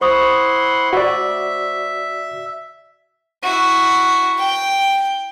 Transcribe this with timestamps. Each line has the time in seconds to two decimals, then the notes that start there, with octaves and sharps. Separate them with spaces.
0.01 E4 C5 F#5 C6 C#6 D#6
0.93 F#4 D5 E5
3.43 E4 F#4
4.38 G5